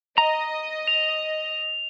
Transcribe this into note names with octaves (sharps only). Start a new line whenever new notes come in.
D#5 A#5
F7